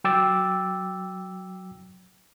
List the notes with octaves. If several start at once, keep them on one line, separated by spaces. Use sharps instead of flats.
F#3 G5 D6 E6 A6